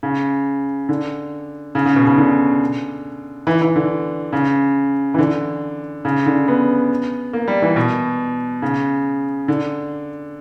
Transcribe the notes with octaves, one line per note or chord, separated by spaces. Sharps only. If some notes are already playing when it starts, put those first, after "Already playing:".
C#3
D3
C#3
C#3
B2
C#3
D3
E3
E3
D3
C#3
E3
D3
C#3
D3
B3
A#3
G3
E3
B2
C#3
D3